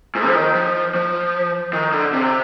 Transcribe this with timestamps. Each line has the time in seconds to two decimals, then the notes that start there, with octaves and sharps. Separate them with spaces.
0.15 G#2
0.27 F3
0.35 D#3
0.55 F3
0.95 F3
1.73 D#3
1.93 D3
2.13 C3